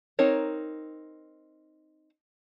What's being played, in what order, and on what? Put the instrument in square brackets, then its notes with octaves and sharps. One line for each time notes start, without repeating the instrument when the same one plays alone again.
[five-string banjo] C4 D#4 A#4 C#5